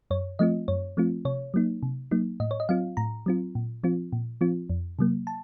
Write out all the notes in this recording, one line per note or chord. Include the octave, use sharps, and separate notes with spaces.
F#2 C#5
F3 A3 C4 F4 D#5
F#2 C#5
F3 A3 C4 F4
C3 C#5
F#3 A#3 D#4
C3
F#3 A#3 D#4
A2 D#5
C#5
D#5
F#3 C4 F4 F5
A2 A#5
F#3 C4 F4
A#2
F3 C4 F4
A#2
F3 C4 F4
F2
C3 F#3 A#3
A5